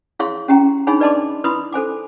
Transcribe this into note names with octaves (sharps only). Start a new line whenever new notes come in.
E4 G#4 C#5 F5 C6 C#6
C#4 G4 G5 A#5
D4 D#4 G#4 C#5 G#5 B5
B4 D5 D#5 A5 C6 D6
E4 B4 B5 C6 D#6
A4 C5 G#5 D6